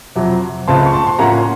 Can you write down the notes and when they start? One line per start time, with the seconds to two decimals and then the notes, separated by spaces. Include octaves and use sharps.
0.16 F2 C3 F#3
0.68 C#2 C#3 A3 C4 A5 C6
0.86 C#6
0.93 A5 C6
1.07 C6
1.18 A2 F3 A#3 C#4 F#5 A#5
1.38 C6